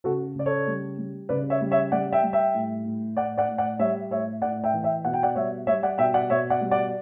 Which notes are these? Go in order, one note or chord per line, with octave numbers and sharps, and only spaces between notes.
C#3 F#4 A4
C#3 D5
A4 C#5
G3
G3
C#3 B4 D5
C#5 E5
G3
C#5 E5
G3 D5 F#5
E5 G5
G3
E5 G5
A2
A2
A2 D5 F#5
D5 F#5
A2
D5 F#5
G3 C#5 E5
A2 C#5 E5
A2 D5 F#5
E5 G5
E3
E5 G5
B2 F#5
G5
D5 F#5
G3 C#5 E5
G3 C#5 E5
D5 F#5
B2 E5 G5
D5 F#5
B2 C#5 E5
D5 F#5
G3
D5 F#5